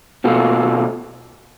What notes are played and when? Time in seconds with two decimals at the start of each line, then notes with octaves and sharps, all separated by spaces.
0.24 B2 A3 C4 F4